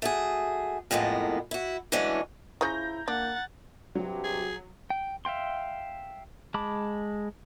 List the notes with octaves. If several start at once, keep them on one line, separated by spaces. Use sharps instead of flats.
A3 F#4 G#4
F2 A2 G#3 A#3 B3
E4 F#4
E3 F#3 G#3 A3 C#4 D4
C#3 F3 C#4 E4 A#5 G6 A#6
A#3 D4 F#5 A6
G2 C3 F#3 G4
G#4
G5
E5 F5 G5 C6
G#3 A5 B5 D6